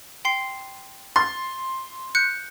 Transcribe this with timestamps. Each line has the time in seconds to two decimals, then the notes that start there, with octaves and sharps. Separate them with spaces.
0.25 G5 C6 C7
1.16 C6 A6
2.15 F#6 G6 C#7